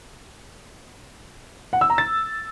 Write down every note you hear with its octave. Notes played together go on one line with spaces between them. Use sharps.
F#5
E6
A#5
A6